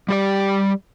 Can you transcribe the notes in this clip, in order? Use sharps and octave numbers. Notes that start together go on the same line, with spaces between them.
G3 G4 D5